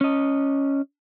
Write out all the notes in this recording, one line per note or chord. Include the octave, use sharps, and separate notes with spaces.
C#4 D#5